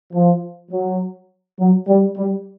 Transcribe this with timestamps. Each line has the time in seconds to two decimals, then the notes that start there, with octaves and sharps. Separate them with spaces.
0.13 F3
0.71 F#3
1.58 F#3
1.87 G3
2.17 G3